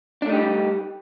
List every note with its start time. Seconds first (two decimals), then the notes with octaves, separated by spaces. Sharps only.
0.22 D4
0.26 A3
0.29 D#4
0.33 G4
0.37 G3